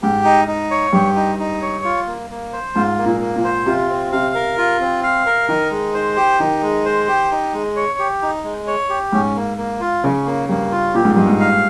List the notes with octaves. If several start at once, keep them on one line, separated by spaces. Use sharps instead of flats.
G#2 G4
D#4
D#4
C#5
G2 G4
D#4
D#4
C#5
F4
A#3
A#3
C5
G#2 F4
A#3
A#2
A#3
A#2
C5
C3 F4
C4
C3 F5
A#4
F4
C4
F5
A#4
D#3 D#4
G#3
C5
G4
D#3 D#4
G#3
C5
G4
D#4
G#3
C#5
G4
D#4
G#3
C#5
G4
G#2 C#4
A#3
A#3
F4
C#3 C#4
A#3
G2 A#3
F4
A#2 G4
G#2
G2 D#4
G#2
F5